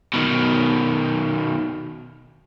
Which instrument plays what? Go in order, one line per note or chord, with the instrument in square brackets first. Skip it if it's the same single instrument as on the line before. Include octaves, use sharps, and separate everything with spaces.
[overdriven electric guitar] B2 D#3